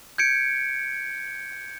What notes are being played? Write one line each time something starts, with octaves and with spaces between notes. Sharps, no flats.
G6 G#6 C#7 D7